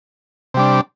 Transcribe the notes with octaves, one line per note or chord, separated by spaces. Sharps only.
C3 G3 D4